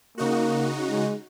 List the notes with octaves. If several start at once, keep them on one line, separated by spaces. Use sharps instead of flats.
C#3 A#3 D#4 F#4
G#3